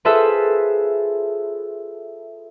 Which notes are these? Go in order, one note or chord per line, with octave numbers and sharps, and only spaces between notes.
F4 G#4 A4 B4 C5 E5